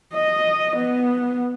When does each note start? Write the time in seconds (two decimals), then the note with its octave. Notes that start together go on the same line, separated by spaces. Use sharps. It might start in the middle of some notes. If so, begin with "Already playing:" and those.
0.14 D#5
0.77 B3